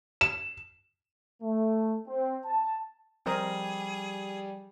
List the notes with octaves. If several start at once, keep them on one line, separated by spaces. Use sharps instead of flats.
E7
A3
C4
A5
F3 G3 C4 G#4 A#4 D#5